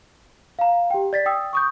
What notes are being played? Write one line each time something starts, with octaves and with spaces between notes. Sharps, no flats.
F5 A#5
G4 G5
D5 A6 B6
G5 D#6 E6
C#6 D#6 G6